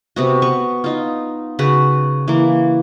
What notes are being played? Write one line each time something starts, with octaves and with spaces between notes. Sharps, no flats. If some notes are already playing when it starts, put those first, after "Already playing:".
C3 B3 F#4
B3 C#6
D#4 F4
C#3 F#4 B4
E3 A#3